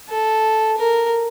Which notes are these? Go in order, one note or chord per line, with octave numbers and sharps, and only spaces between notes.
A4
A#4